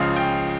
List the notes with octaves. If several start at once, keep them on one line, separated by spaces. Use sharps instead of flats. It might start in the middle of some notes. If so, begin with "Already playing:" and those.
Already playing: C#2 C#3 F3 F5
G5